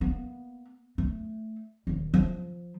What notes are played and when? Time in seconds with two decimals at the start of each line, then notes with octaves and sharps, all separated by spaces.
0.01 A#3 B3
0.98 A3
1.87 D#1 D#3
2.14 F3